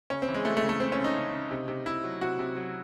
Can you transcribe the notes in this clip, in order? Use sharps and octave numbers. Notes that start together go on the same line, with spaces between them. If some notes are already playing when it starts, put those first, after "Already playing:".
C#3 C#4
C4
E3
G#3
E3 A3
A3
C#3
A3
C#3 C4
C#4
C#3
D#4
C#3
C#3
C3
C3
C3 E4
F#3
C3 F#4
C3
F#3